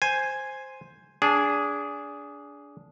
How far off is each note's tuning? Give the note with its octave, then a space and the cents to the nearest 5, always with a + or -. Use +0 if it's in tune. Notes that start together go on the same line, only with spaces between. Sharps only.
C5 +0 G#5 +0
D4 -20 G#4 +0